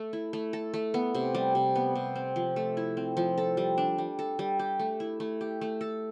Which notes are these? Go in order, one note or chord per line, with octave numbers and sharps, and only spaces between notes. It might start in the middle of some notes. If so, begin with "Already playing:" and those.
Already playing: A3 A4
E4
A3
A4
A3
B3
C3
G3
C3
B3
C3
C4
F3
A3
E4
C4
F3
A4
G3
D4
G3
A4
G3
G4
A3
E4
A3
G4
A3
A4